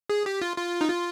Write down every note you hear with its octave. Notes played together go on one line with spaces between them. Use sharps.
G#4
G4
F4
F4
D#4
F4